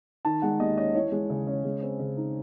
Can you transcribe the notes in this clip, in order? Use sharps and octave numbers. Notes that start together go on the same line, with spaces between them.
D#3 A5
G#3 F#5
D#2 D#5
C#4 D#5
E3 C#5
G#3
C#3
C#4
G#3
C4
C#3
D#4